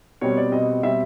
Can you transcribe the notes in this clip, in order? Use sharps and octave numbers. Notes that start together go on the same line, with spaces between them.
B2 G3 C4 C#5
D5
B2 G3 C4 D#5
B2 G3 C4 E5